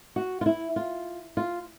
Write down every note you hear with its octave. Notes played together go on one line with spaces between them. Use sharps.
F#4
F4
E4
F4
F4